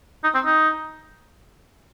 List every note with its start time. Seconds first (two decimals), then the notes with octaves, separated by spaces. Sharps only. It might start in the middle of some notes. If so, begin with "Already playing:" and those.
0.24 D#4
0.35 C4
0.46 D#4